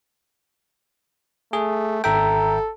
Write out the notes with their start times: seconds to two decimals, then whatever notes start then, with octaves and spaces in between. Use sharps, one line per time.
1.53 A3 G#4
2.04 G#1 A4 E5 G5 A#5